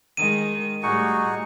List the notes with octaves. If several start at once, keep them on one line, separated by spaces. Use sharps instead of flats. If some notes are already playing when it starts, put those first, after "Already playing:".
D#3 G#3 D#7
A2 G3 D#4 F#4 G#4 C#6